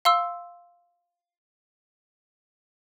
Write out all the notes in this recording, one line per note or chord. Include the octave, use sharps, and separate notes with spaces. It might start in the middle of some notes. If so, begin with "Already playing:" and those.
F5 C6 E6